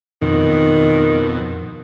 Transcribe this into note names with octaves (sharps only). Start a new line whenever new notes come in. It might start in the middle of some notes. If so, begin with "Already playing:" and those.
F2 B2 D#3